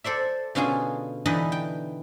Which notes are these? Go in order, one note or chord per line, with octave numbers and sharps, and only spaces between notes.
A4 C5 D5 E5
B2 D3 C#4 F4 G#4
D3 E3 D#4 B4 D#5 B5
G5